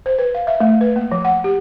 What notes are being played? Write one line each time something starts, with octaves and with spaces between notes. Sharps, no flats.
C5
B4
F5
E5
A3
B4
A#3
F3
F#5
G4